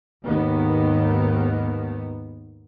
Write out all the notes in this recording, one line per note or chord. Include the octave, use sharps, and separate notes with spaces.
D#2 G#2 D#3 B3